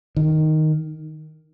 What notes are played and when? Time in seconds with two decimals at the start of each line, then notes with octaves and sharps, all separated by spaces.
0.16 D#3